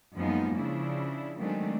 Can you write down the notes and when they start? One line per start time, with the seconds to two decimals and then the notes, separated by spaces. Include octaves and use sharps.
0.16 F#2 F3 G#3 A#3 B3 D#4
0.56 C#3 F3 D4 E4
1.38 D#3 F#3 G#3 A3 C4 D4